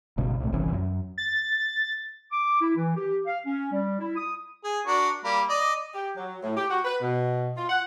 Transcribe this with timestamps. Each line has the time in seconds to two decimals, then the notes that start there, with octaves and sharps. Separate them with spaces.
0.18 G1 C#2 B2
0.40 C2 A2
0.53 G1 C2 E3 C#4
0.73 F#2
1.18 A6
2.32 D6
2.61 E4
2.76 E3
2.96 G4
3.26 F5
3.46 C#4
3.72 G3
3.99 E4
4.16 D#6
4.64 G#4
4.86 D4 F#4 A#4
5.24 G3 A#3
5.49 D5 D#5
5.95 G4
6.17 F#3
6.43 A2
6.57 G4
6.70 F#4
6.85 B4
7.02 B2
7.57 F4
7.70 F#5